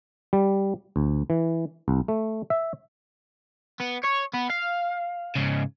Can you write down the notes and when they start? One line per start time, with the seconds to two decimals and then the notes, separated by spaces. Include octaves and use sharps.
0.33 G3
0.96 D2
1.30 E3
1.88 C2
2.08 A3
2.50 E5
3.80 B3
4.04 C#5
4.33 B3
4.50 F5
5.36 G#2 C#3